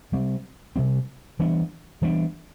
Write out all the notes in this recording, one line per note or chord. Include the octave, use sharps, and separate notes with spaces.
C3 G3 C4
C3 G3 C4
E3 G3 B3 D4
E3 G3 B3 D4